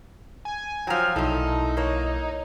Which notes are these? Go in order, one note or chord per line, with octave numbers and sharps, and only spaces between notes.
G#5
F3 F#3 G5 A#5 F6
B1 A#2 D#4 E4 A4
A#3 C#5